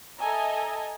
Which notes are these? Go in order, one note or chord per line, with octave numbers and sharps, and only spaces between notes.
A4 D#5 E5 G#5 A#5